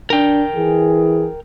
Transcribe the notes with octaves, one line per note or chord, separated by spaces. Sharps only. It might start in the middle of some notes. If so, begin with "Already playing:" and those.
D4 A#4 G5
E3 G#4